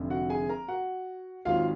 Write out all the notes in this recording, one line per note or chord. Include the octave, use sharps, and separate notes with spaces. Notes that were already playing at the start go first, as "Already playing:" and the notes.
Already playing: F1 F2 D3
F#4 F#5
G#4 G#5
A#4 A#5
F#4 F#5
G#1 G#2 F#3 F4 F5